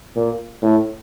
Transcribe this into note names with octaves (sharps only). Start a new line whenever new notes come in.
A#2
A2